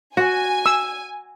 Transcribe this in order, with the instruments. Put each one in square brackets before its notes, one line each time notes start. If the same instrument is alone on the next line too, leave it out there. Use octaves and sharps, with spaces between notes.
[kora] F#4 [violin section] G#5
[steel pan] E6